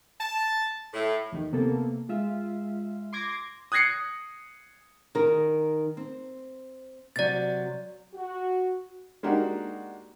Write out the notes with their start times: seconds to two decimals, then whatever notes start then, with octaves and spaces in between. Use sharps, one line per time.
0.19 A5
0.94 A2
1.32 D#2 D#3
1.53 C3 A#3 B3 A4
2.09 G#3 F4 E5
3.13 C6 D6 G#6 A#6
3.72 D#6 F#6 G#6 A#6 C7 C#7
5.15 D#3 A#4
5.97 C4
7.16 C3 F#3 D5 A6
8.14 F#4
9.23 G#3 A#3 D4 D#4 F#4 G4